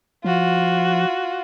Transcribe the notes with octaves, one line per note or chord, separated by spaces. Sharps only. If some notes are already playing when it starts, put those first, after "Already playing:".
F3 F4 F#4